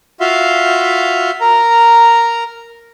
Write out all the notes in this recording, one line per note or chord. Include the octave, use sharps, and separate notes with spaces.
F4 F#4 E5 F5 C6
A#4 A#5